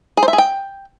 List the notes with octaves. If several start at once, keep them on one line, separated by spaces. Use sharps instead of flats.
G#4
C5
E5
G#4
G5